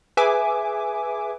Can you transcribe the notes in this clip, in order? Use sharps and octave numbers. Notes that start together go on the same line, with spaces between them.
G#4 B4 E5 G#5 D6